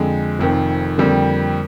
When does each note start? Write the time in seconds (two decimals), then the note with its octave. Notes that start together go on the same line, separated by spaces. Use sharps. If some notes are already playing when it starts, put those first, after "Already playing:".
Already playing: F2 D3 G#3
0.39 F1 F2 D#3
0.98 F2 D3 G3 A#3